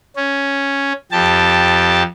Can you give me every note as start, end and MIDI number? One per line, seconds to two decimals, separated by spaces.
0.17 0.93 61
1.12 2.03 41
1.12 2.03 67
1.12 2.03 81